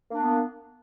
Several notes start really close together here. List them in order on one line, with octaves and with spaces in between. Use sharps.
A#3 D4 B3